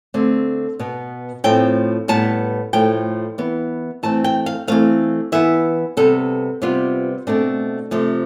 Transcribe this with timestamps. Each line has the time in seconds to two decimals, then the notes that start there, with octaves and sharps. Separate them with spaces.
0.14 D3 A3 C4
0.79 B2 B3
1.44 A2 F3 A3 C4 G5
2.08 A2 G3 B3 A5
2.73 A2 F3 A3 G5
3.38 E3 B3
4.03 E3 A3 C4 A5
4.24 G5
4.46 F5
4.67 E3 A3 C4 F5
5.32 E3 B3 E5
5.97 C3 G3 B3 A4
6.62 C3 G3 B3 F4
7.27 B2 A3 C4 D4
7.91 C3 F3 A3